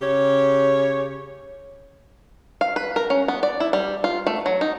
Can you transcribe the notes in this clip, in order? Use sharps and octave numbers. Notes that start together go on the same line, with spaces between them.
C#3 G4 C#5
F5
B4
A#4
C#4
B3
D5
E4
G3
F4
A3
F#3
D#4